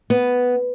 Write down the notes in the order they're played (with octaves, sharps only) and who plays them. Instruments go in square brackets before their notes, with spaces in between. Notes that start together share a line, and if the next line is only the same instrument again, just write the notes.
[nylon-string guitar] B3